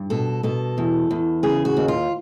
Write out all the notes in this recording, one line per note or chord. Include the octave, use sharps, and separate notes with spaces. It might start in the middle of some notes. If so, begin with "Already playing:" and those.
Already playing: G2
B2 A4
B2 A4
E2
E2
C#3 G#4
F#4
D#2
F4